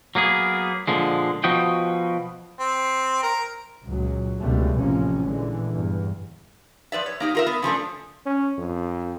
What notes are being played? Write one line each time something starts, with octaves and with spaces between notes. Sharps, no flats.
F#3 A#3 B3 G#4
A#2 D3 F3 G#3
B2 F3 F#4 D#5 G5
C4
A#4
C#2 A#2 F#3
C#2 B2 D3 G3 A3
A1 A2 C3 F3 A#3 C#4
A#2 D3 E3 G#3
E2 G2
F3 B4 D5 E5
C#5
A#3 D#4 G4
F4 A#4 E5
B3
C#3 F3 A3 D4
C#4
F2